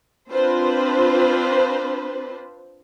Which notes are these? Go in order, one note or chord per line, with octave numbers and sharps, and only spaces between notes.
C4 D4 F4 B4 C5